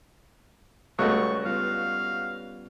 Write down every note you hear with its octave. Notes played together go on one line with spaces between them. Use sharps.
C#2 G3 A3 C#4 F#4 D#5 C#6
G3 B3 F4 F5